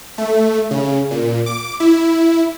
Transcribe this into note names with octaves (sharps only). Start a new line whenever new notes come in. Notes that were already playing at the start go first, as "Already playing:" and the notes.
A3
C#3
A#2
D6
E4